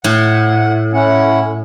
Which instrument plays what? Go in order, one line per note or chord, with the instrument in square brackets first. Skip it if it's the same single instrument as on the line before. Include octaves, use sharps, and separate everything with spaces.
[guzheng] A2 [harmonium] F#5
[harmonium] C#4 E4 F#5